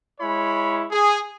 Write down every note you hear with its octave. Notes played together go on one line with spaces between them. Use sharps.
G#3 E4 C#5 B5
G#4